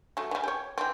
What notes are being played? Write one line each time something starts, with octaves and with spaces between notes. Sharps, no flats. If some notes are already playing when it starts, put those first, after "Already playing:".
F#3 A3
C#3 E3
G4 C#5
E3 C4